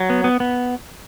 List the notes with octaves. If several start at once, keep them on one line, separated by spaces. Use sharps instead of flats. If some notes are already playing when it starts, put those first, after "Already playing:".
Already playing: F#3
B3
B3
B3